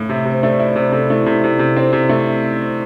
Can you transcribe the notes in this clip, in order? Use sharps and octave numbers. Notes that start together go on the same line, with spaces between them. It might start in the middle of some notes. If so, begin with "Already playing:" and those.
Already playing: A2
C3 E5
C3
C5
A3 D5
E4
C3 C5
C3 A4
A3 E4
C3 E4
C3
C3
C4
C3
A3